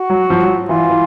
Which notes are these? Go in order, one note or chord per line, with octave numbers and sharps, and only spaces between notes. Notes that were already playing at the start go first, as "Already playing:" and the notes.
Already playing: F#4
F#3
F3
F#3
E3 F4
E3